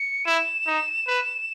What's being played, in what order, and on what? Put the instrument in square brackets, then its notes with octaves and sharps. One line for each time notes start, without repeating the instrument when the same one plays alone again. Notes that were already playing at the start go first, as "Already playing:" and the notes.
Already playing: [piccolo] C#7
[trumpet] E4 [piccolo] E7
[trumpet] D#4
B4